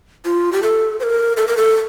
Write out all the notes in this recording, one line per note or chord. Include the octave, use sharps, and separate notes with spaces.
F4
G4
A4
C5
A#4
A4
A#4
A4